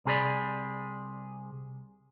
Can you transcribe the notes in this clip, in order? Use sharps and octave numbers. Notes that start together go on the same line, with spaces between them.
C2 C3 G#4 B4 D5 B5